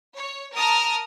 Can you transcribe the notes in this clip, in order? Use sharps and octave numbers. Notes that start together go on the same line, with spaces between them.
C#5
A#4 A5 A#5 D#6 F6